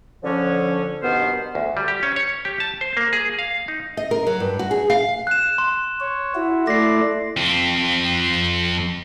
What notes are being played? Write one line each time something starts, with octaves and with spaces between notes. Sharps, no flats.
D3 F3 C#4
G2 B2 D#3 B3 C5 F6
D2
G3
G4
C#4
C#5
G4
A5
C5
A#3
G#4
F5
D#4
D#5
A#4
F#3
G2
F#4
G#4
F5
F#6 E7
C6
C#5
E4 F#4
A3 E4 D5 A#6 C7
F2 C4